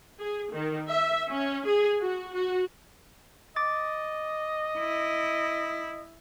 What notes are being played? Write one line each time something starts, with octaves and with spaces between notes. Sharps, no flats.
G#4
D#3
E5
C#4
G#4
F#4
F#4
D#5 D6 A6
E4